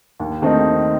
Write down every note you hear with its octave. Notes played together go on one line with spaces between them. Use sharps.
D#2
D#3 A3 C4 D#4